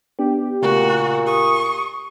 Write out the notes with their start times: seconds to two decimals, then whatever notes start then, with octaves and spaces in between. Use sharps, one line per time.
0.19 B3 D4 G4
0.62 A#2 C#3 A3 F#4 A#4
1.26 G4 C#6 D#6